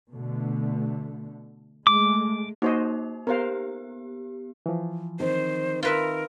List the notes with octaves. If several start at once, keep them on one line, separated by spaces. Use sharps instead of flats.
B2 D3 A3
G#3 A3 D6
A#3 D#4 F#4 C5 D#5
B3 G4 A#4 C5 F5
E3 F3
D#3 C4 C5
F4 A#4 B4 E5